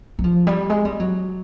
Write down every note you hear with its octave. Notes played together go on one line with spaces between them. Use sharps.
F#3
F3
G3
G#3
G3
F#3